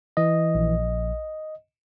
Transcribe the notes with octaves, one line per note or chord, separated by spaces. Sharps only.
E3 D#5
A#1